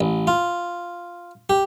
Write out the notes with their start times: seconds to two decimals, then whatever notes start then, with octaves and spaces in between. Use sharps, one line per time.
0.01 A1
0.27 F4
1.50 G4